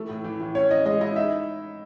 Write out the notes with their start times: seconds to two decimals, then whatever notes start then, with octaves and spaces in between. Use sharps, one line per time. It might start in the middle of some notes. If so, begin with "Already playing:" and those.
Already playing: E3 A3
0.09 A2
0.24 E3
0.40 A2
0.55 C#4 C#5
0.71 E3 D#5
0.85 G#3 D#5
1.01 E4 D#5
1.16 D#4 E5